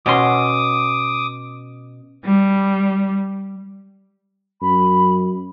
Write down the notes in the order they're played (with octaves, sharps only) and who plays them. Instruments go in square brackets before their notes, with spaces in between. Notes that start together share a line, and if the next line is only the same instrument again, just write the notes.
[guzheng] B2 C#4 C6 [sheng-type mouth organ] D6 D#6
[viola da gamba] G3
[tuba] F#2 [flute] B5